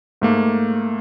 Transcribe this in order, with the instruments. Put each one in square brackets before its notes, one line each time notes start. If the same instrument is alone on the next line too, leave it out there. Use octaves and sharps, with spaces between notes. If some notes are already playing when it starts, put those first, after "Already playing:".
[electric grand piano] G#2 A3 A#3